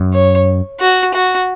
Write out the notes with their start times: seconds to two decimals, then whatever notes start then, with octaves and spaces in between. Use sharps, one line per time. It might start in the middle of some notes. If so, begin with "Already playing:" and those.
Already playing: F#2
0.14 C#5
0.80 F#4
1.14 F#4